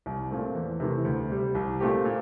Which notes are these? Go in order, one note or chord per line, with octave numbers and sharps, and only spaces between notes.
C2
A#2 A3 C4
E2
C3 E3 A3
D2
C3 G3
C2
A#2 A3 C4 G4
A#2